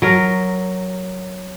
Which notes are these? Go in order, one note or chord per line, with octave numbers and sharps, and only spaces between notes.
F#3 A#4